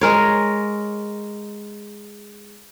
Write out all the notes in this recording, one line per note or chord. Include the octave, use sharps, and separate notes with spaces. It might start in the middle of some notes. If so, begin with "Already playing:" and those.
G#3 A#4 C#5